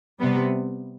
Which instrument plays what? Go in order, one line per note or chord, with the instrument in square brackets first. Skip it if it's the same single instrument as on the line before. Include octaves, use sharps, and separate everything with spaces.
[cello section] C3 G3 B3